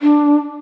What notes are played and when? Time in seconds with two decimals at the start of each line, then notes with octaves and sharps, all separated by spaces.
0.01 D4